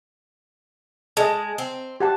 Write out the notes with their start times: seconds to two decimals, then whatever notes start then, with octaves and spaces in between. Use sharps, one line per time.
1.17 G#3 D#5 A5
1.58 C4
2.00 G4 F#5 A5